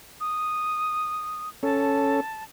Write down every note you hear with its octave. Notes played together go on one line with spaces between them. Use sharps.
D#6
C#4 A4 A5